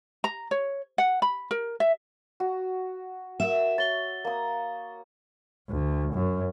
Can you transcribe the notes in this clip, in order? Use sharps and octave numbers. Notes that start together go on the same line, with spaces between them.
A#5
C#5
F#5
B5
A#4
E5
F#4
A#4 E5 E7
C#5 A6 G7
A#3 D#6
D2
F#2